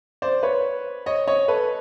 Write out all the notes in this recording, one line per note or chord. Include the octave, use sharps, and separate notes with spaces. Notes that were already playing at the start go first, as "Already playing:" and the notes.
C5 D5
B4 C#5
C#5 D#5
C#5 D#5
A4 B4